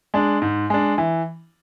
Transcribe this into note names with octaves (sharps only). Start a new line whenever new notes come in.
G#3 D4
G#2
G#3 D4
E3